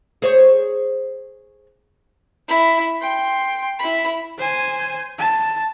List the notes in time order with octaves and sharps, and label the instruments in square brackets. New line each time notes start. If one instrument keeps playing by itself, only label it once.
[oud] G#4 C5 C#5
[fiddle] E4 B5
G5 C6
E4 B5
[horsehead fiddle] C5 G#5
A5